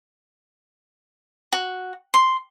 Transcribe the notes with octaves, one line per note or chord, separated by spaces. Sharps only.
F#4
C6